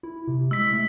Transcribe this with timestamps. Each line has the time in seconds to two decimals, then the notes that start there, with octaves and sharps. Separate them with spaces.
0.03 E4
0.27 C3
0.51 G#3 E6 B6
0.73 A3